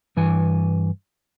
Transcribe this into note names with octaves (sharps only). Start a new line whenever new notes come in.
G2 E3 G#5